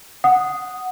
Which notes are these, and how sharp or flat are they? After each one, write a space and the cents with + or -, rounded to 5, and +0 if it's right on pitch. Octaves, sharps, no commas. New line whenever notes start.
F#5 +0 D#6 +0